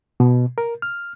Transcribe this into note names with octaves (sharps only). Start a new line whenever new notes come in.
B2
A#4
F6